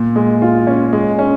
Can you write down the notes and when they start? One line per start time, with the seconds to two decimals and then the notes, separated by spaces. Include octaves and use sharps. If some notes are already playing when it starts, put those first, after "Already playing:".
Already playing: A#2
0.16 G#3
0.42 F4
0.67 C#4
0.93 G#3
1.19 C#4